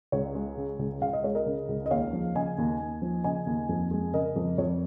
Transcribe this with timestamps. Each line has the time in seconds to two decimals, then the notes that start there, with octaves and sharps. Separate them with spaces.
0.12 C#2 C#5
0.35 G#3
0.57 C#3
0.79 C#2
1.02 C#2 F5
1.13 D#5
1.24 G#3 C#5
1.35 A#4 D#5
1.46 C#3
1.69 C#2
1.86 D#5
1.91 D#2 C#5 F5
2.13 F3
2.35 C#3 D#5 G#5
2.58 D#2
2.80 D#2
3.02 F3
3.24 C#3 D#5 G#5
3.47 D#2
3.69 F2
3.91 G#3
4.13 C#3 A#4 D#5
4.36 F2
4.58 F2 C#5